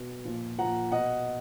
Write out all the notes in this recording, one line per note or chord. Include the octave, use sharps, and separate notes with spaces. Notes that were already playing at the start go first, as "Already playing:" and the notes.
Already playing: B2
A#2 F3
A#2 F3 F#5 A#5
B2 D#5 F#5